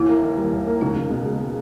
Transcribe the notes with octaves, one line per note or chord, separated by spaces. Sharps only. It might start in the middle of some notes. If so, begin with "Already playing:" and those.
Already playing: D#2 E3 E4
A#3
D#3
G3
D#2
A#3
C#2 D#4
C#2
B2
G#3